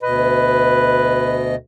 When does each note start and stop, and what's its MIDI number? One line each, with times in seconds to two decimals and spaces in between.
0.03 1.55 38
0.03 1.55 47
0.03 1.50 71
0.03 1.55 75